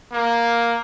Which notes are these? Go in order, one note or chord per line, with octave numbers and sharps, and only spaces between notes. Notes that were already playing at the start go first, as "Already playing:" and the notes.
A#3